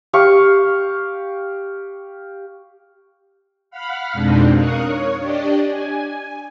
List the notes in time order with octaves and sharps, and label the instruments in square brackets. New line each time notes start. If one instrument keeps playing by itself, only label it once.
[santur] G4 F5 C#6
[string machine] F5 F#5 B5 F6
F2 B2 G#3 C4 D4 D#4
A#4 F5 C#6 D#6 F#6
C#5 C#6
D4 G4 D5 D#5
G#5